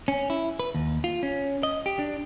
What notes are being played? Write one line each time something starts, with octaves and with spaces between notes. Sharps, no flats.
C#4
E4
B4
D#2
F4
C#4
D#5
G4
D4